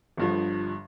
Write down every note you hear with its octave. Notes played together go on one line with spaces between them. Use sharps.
G1 G2 D3 F3